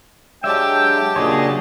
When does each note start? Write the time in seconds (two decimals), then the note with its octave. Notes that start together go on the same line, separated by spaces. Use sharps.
0.44 F#3 G#3 D4 G4 E5 G5 A5
1.16 A#2 C#3 F#3 D4 G#4 C#5 D#5